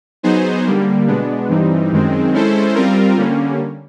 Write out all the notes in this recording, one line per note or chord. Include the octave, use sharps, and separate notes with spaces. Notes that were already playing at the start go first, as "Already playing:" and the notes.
F#3 B3 D#4 G#4 C5
D3 G3 A#3
B2 G#3 B3 D4
G2 E3 G3 C4 D#4
F#2 D#3 G#3 C4
G#3 C#4 E4 A4 C5
G3 C4 F4 A#4
D3 G3 A#3 C#4